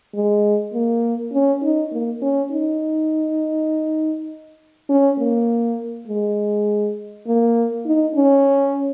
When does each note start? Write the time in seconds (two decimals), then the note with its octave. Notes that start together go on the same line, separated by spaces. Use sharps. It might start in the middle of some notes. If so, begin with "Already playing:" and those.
0.15 G#3
0.73 A#3
1.33 C#4
1.63 D#4
1.92 A#3
2.22 C#4
2.52 D#4
4.89 C#4
5.18 A#3
6.08 G#3
7.27 A#3
7.86 D#4
8.15 C#4